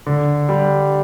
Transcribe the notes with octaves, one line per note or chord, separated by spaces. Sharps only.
D3
G3 D4 G4